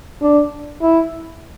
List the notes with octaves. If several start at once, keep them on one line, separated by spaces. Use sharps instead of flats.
D4
E4